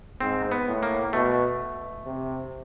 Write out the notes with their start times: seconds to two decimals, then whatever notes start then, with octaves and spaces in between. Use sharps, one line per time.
0.21 G#2 C4
0.52 B3
0.67 A2
0.83 A#3
1.13 B2 A3
2.06 C3